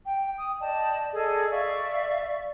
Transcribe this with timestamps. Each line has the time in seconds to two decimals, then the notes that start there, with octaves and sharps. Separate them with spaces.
0.05 G5
0.38 D#6
0.61 D5 D#5 G5 A5
1.13 G#4 A4 D5 D#5
1.50 D5 E5 F5 C#6